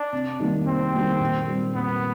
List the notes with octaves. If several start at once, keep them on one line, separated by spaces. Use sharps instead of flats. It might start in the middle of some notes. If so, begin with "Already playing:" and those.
Already playing: D4
C3
D#3 G3 A#3
C3 C4
D#3 G3 A#3
A#2
G3 C4
A#2 B3